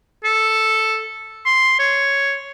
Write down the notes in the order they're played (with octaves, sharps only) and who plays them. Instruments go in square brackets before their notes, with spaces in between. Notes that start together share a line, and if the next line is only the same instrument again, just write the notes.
[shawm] A4
C6
C#5